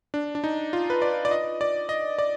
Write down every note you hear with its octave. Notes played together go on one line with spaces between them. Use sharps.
D4
D4
D#4
F4
B4
D5
D5
D#5
D5
D#5
D5